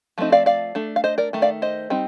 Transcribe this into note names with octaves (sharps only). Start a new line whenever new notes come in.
F3 A3 C4 D#4
D5 F5
D5 F5
A3 D4
F5
C5 D#5
A#4 D5
D#3 A3
D5 F5
C5 D#5
G3 C4 D#4